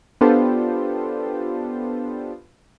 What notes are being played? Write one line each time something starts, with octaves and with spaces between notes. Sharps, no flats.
B3 D4 F4 G4 A4 C5